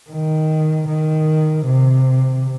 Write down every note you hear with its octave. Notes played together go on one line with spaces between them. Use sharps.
D#3
D#3
C3